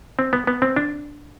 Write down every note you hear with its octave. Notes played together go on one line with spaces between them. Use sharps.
C4
B3
B3
C4
D4